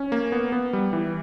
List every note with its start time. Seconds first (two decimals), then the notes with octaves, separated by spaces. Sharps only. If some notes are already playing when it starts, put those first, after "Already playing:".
Already playing: C#4
0.12 A#3
0.32 B3
0.52 B3
0.73 G3
0.93 E3